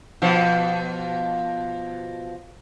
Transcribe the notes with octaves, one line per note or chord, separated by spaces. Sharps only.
B2 F3